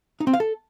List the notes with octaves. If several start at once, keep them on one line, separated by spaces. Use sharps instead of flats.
D#4
C4
F5
A4